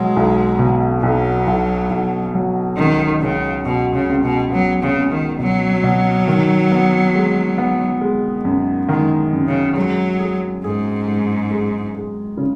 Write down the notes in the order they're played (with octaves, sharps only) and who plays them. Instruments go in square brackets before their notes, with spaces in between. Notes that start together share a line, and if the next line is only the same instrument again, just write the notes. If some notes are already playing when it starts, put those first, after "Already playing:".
Already playing: [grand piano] B2 F#3 [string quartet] G#3
[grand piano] B1
B2
[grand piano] B1 [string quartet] F#3
[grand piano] B1
B1
F#3
[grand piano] C#2 [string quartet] D#3
[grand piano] C#2 [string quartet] C#3
[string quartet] B2 [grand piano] F#4
[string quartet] C#3
[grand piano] C#2
[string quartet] B2
[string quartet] F#3 [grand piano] B3
[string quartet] C#3
[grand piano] C#2
[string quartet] D#3
[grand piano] B2 [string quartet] F#3
[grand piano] B2
D#3
B3
G#3
B3
G#3
F#2
[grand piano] D#3 [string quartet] G#3
[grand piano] F#2
[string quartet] C#3
[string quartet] F#3 [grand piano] G#3
[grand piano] G#4
[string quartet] G#2 [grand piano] G#4
[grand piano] G#3
G#3
G#3
C#3